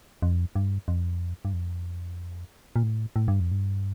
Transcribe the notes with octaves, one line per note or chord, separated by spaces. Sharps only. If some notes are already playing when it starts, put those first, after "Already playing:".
F2
G2
F2
G2
F2
A#2
A2
A2
G2
F2
G2